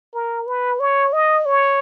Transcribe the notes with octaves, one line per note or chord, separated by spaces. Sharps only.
A#4
B4
C#5
D#5
C#5